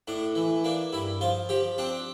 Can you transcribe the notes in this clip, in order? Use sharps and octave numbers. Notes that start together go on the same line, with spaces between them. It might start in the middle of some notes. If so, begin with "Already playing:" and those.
A2 D4
E3
A#3 D4
G2 E4
F3 F4
F3 G4
C4 D4